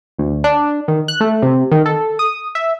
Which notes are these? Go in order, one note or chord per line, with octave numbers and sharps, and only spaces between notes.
D2
D4
D#3
F#6
A3
C3
D#3
A4
D#6
E5